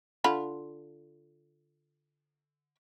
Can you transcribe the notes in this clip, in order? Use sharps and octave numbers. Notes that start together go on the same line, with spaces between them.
D3 F4 B5